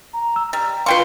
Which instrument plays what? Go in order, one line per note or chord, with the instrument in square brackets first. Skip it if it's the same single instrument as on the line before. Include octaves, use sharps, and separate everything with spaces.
[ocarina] A#5
[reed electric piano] E6
[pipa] G3 [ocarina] A#5
[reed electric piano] F4 F5 [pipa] B4 G5 C#6 [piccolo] C6